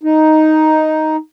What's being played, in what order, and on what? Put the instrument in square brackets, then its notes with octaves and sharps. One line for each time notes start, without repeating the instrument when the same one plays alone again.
[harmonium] D#4